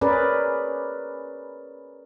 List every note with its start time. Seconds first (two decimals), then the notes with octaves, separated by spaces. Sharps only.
0.01 C#4 G#4 A#4 B4 D5